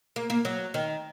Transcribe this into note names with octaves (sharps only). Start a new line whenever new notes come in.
A#3
A#3
F#3
D#3